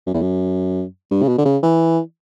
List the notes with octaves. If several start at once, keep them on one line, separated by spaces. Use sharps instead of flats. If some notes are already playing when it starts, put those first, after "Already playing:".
F#2
E2
F#2
G2
C#3
B2
D3
C#3
E3